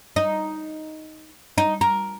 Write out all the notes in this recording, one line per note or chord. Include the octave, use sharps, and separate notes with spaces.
D#4
D#4
A#4